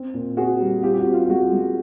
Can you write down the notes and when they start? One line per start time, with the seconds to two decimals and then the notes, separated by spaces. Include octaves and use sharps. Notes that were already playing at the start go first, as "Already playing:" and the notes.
Already playing: C4
0.14 A#2
0.37 C4 F#4 G#4
0.60 G3
0.83 C4 F4 G4
0.94 G4
0.99 F#4
1.06 C4
1.14 F4
1.25 F4
1.29 G#3 F#4
1.53 G#3